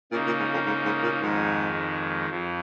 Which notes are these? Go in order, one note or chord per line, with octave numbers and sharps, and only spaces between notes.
A#2 C#3 A#3 D#4
A#2
G#2
F2
G#2
G#2
A#2
F2 G#2 D#3 G#3
F2 F3